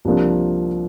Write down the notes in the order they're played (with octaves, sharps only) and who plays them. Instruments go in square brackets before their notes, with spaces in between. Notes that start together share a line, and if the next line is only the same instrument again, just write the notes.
[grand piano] C2 C3 F3 A#3 D4